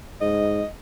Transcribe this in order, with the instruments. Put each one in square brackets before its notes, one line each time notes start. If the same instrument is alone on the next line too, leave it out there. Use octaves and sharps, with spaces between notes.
[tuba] G#2 [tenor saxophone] D#5